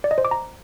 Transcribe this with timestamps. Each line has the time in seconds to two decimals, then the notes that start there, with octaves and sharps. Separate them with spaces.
0.04 D5
0.11 D#5
0.18 C5
0.25 D6
0.31 A#5